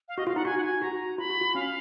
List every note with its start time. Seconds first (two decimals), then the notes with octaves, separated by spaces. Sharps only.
0.08 F5
0.17 F#4 D#5
0.27 F4 F5
0.36 D#4 F#5
0.45 F#4 G#5
0.58 F#5
0.63 G#5
0.82 F#4 A#5
1.18 F4 B5
1.30 F#4
1.41 F4
1.55 C#4 F5